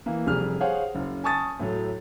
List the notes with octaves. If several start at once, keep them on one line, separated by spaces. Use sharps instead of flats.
E3 A#3
F1 G3 G#4 F6
G#4 C5 C#5 F5 F#5
F#1
G#5 A5 C#6 D#6 A6
A2 F#3 A3